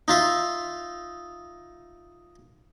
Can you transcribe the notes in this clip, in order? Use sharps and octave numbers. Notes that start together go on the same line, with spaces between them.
D#4 F4 E5